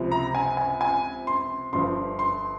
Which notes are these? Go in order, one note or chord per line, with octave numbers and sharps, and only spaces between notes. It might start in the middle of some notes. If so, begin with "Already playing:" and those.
Already playing: C#2 C3 F3
A#5
G#5
G#5
G#5
C6
G1 G2 F3 C6
C6